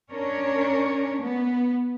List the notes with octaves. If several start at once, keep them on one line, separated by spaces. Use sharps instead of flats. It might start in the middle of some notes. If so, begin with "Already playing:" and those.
C#4 D4 A#4 C#5
B3